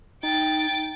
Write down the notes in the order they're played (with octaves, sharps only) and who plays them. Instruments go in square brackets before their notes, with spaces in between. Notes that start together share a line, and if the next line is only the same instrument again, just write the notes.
[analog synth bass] D#4 [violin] G5 A6